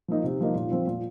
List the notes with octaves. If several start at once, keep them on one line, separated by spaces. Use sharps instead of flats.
F3 A#3 D#4
C3
F3 A#3 D#4
A#2
F3 C4
A#2